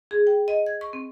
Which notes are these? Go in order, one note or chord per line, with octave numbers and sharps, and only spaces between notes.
G#4
G5
D#5
G#6
C#6
C4